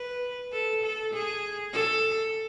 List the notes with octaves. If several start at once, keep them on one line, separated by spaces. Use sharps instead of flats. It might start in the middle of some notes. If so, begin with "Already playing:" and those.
Already playing: B4
A4
A4
G#4
A4